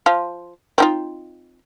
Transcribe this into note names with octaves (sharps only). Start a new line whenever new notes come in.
F3 F5
C4 D#4 F4